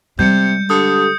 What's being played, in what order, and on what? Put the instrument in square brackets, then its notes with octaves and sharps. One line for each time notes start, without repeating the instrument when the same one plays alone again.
[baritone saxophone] C3 [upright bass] G3 G#3 [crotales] G6 C#7
[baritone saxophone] D3 [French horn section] G4 A4 [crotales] D#6